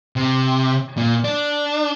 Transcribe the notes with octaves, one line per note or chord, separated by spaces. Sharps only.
C3
A#2
D4